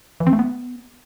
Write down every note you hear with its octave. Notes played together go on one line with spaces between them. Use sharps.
E3
C4
A3
B3